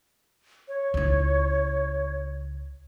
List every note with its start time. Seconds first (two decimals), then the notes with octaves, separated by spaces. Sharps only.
0.68 C#5
0.94 C#2 E4